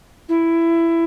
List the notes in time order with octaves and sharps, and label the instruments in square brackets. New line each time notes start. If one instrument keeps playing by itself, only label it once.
[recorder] E4